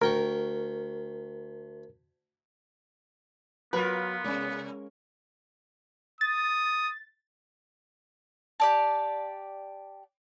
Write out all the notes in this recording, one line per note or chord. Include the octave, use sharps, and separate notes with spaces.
D2 A#4 G5 C#6
F#3 B3 F4 A#4 B4
C3 G#3 C#4
D#6 A6
G4 D5 A5